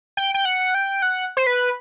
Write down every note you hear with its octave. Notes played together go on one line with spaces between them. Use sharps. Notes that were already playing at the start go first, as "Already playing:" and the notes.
G5
G5
F#5
G5
F#5
C5
B4